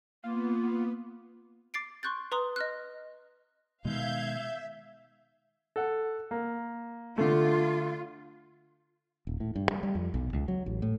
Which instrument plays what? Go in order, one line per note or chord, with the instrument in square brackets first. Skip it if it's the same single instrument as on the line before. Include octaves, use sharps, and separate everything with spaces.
[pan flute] A#3 [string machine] B3 [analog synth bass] F4
[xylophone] D6 A6 C7 D7
C6 C#6 F#6 G6 A6
B4 A#5 C6 D#6
D#5 F6 F#6
[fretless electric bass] B2 D#3 [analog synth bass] G#3 [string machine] E5 [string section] F5 G6 G#6
[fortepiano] A4 F#5
A#3
[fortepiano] D3 A3 [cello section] F4
[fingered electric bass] D#1
A2
G2
G3
G3
F2
B1
C#2
F#3
A1
A2